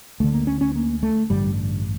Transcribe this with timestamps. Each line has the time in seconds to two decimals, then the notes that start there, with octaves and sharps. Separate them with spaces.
0.20 D2 D3 A3
0.33 A#3
0.47 C#4
0.61 C#4
0.75 A#3
1.03 A3
1.30 A1 G2 D3 G3